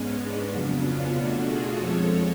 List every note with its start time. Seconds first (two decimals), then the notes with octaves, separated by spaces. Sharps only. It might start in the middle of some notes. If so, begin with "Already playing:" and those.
Already playing: G#2 G#3 B3 C#4
0.17 D4
0.51 F2 C#3 F#3 B3
0.82 C#4 F4
1.15 B2 A3 D4 F#4
1.47 F4 G#4
1.79 F2 F3 G#3 A4 C#5